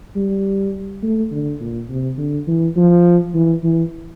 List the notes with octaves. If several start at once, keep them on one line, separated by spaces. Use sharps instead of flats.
G3
A3
D3
A#2
C3
D3
E3
F3
E3
E3